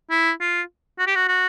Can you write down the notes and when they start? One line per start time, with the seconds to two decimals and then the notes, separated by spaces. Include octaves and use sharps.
0.10 E4
0.41 F4
0.99 F#4
1.07 G4
1.15 F#4
1.28 F#4